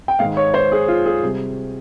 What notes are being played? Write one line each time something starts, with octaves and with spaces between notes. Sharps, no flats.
G5
G#2 D#3 G#3 F5
C#5
C5
G#4
F4
G#4
C3 G3